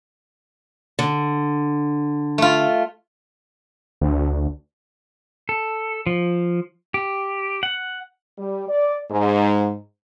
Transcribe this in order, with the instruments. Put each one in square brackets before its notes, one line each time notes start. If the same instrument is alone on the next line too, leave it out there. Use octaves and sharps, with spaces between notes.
[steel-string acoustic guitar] D3
[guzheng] A3 F4
[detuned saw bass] D2
[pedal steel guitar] A4
F3
G4
F#5
[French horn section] G3
D5
G#2